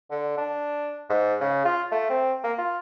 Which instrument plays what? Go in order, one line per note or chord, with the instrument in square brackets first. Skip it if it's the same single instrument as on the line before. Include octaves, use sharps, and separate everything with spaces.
[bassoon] D3
D4
G#2
C#3
F4
A3
C4
A#3
F4